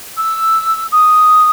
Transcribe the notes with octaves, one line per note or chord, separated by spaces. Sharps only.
E6
D#6